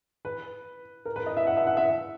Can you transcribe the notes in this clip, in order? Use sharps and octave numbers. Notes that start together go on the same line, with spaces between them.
B4
A#4
B4
D#5
E5
F#5
E5
F#5
E5